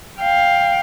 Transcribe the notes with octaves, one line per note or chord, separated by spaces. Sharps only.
F5 G5